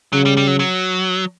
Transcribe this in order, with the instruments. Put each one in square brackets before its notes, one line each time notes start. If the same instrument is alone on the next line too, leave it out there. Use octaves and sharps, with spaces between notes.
[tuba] C#3 [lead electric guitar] F#3
[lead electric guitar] G3
G3
F#3
F#3